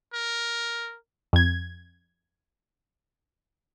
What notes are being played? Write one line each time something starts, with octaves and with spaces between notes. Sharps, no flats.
A#4
F2 G#6